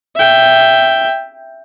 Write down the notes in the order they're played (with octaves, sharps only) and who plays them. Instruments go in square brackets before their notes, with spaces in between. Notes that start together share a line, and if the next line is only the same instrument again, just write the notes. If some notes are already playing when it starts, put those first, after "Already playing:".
[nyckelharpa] E5 G5